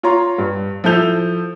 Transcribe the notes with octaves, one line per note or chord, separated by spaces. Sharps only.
F4 C#5 A#5 C6
G2
F3 E4 A4 G6 F7